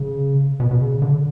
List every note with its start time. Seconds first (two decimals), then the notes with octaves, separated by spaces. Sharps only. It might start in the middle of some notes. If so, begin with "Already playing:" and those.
Already playing: C#3
0.60 B2
0.71 B2
0.81 C#3
1.02 D3